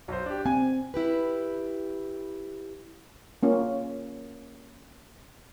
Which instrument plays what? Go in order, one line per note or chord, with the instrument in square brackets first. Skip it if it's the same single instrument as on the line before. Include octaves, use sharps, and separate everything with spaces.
[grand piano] B1 C5
D4 G4
[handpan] C4 [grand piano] G#5
[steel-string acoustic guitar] E4 G4 B4
[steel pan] A#3 C#4 F4